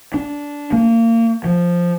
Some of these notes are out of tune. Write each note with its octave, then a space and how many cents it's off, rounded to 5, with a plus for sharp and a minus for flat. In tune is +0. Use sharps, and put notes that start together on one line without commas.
D4 -15
A#3 -30
F3 +0